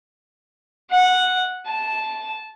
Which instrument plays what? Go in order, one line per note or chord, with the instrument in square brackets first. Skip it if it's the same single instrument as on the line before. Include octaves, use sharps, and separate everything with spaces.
[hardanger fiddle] F#5
A5